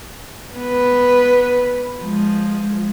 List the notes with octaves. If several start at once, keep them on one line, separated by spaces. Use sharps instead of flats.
B3 B4
F3 G#3